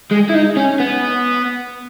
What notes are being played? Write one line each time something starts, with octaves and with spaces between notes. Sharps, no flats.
G#3
E4
D#4
C#4
B3